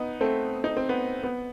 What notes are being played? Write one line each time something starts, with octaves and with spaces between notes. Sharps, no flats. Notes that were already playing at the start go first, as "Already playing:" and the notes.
Already playing: B3 D#4
A3 C4
D#4
C4
B3
B3